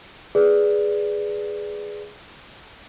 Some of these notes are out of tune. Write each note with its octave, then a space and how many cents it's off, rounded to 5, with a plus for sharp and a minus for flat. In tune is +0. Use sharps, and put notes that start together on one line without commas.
G#4 +0 B4 +0 D5 +0